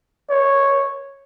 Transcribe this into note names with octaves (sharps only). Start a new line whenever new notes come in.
C#5